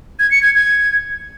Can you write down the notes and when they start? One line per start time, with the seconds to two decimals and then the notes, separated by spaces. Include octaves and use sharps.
0.19 G#6
0.31 C#7
0.43 G#6
0.55 G#6